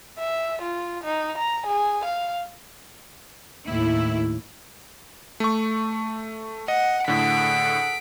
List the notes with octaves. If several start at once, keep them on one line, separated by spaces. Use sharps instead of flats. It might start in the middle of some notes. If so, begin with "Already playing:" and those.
E5
F4
D#4
A#5
G#4
F5
D#2 A2 E4
A3 C#6
D#5 F#5
A2 D3 G#4 A4 F#5 B6 D7